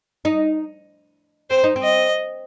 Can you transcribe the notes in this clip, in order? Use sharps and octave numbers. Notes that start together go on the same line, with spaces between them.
D#4
C4 C5
D#4
C4
D#5